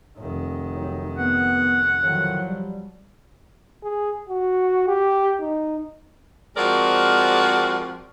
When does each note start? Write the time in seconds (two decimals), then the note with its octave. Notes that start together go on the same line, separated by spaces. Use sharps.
0.18 F1 D#3
0.75 F#3 C4 D#4
1.18 B3 F#5
2.01 A2 D3 D#3 F3 F#3
2.48 G3
3.84 G#4
4.29 F#4
4.88 G4
5.41 D#4
6.56 F3 G#3 C4 F#4 A#4 D5